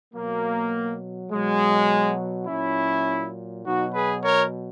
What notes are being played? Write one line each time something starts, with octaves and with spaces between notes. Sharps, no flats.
B2 F#3 A#3
B2 F#3 G#3
A#2 F#3 C#4 E4
B2 F#3 D#4 F#4
G#4 B4
A#4 C#5